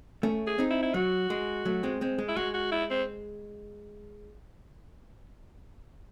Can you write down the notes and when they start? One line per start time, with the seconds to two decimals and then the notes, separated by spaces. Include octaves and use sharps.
0.23 A3 C#4
0.47 G#4
0.58 C4 D#4
0.71 E4
0.83 E4
0.94 F#3 F#4
1.30 G#3
1.65 F#3 A3
1.83 G#3 C4
2.01 G#3 C4
2.18 G#3
2.28 E4
2.37 G#3 F#4
2.54 F#4
2.72 E4
2.91 C4